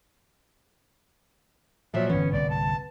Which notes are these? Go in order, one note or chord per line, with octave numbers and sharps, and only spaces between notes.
A#2 F3 F#3 E5
G1 E3 B3 C#4
G1 C2 D5
A5